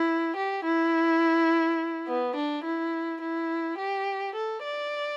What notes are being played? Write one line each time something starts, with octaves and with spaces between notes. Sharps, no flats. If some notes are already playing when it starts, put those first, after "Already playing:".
Already playing: E4
G4
E4
B3
D4
E4
E4
G4
A4
D5